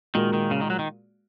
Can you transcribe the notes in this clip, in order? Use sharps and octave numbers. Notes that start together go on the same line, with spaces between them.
A#2 D#3 G#3 F#4 A#4
D#3
C#3
D#3
F#3
D#3